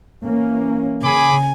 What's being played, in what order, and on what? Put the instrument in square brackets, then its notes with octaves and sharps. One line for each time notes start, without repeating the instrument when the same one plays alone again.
[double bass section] E3 A#3 C#4
[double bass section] C#3 [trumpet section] G#4 B5 D6 [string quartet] G#5